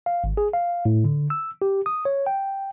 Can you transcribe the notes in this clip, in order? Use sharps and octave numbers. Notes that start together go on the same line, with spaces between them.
F5
G#1
G#4
F5
A2
D3
E6
G4
D#6
C#5
G5